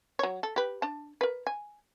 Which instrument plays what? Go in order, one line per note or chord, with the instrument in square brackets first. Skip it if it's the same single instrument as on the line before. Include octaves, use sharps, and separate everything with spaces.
[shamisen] F#3 C#5
A4
G4 B4
D4 A5
A#4 B4
G#5